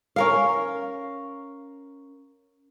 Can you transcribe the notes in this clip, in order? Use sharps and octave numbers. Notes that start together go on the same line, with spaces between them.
C#4 A#4 F5